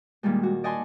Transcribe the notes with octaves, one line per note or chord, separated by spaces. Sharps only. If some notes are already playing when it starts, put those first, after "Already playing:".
A#2 D#3 G3 G#3
F#4
D5 D#5 F#5 G#5 A5 C6